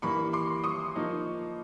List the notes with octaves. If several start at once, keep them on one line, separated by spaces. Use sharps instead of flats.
E3 G3 A#3 B5 C#6
C6 D6
C#6 D#6
F3 A#3 D#4